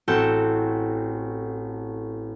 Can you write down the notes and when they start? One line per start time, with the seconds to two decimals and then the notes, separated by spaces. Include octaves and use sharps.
0.08 A1 C4 F#4 A4 G6 E7